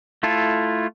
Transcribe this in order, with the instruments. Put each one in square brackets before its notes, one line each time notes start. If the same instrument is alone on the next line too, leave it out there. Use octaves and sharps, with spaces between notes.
[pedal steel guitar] A3 E4 F4 A4